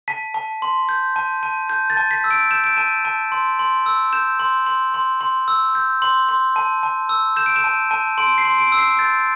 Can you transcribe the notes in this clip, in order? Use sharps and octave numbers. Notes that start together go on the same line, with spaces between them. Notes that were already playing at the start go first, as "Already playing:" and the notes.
A5 B6
A5
C6
G6
A5
A5
A5 G6
A6
A5
B6
E6
D7
G6 E7
D7
A5 E7
A5
C6
C6
E6
G6 E7
C6
C6
C6
C6
E6
G6
C6
C6
A5
A5
E6
G6 E7
D7
E7
A5
A5
C6 D7
C7
C6
D7
E6
C7
G6 A6